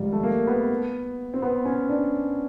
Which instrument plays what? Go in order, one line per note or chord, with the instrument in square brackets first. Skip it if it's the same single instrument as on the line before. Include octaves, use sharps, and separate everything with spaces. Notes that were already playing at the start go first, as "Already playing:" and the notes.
Already playing: [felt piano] G#1 G#2 F3 [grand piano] G3
[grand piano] A3
A#3
B3
C4
B3
C#4
D4